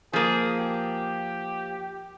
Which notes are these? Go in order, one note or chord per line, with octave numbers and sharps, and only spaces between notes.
F3 A#3 G#4
G4